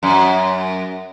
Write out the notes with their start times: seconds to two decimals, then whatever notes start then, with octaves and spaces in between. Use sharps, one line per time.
0.03 F#2